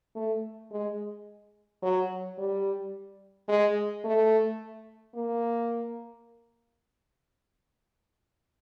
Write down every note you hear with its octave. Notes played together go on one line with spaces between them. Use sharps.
A3
G#3
F#3
G3
G#3
A3
A#3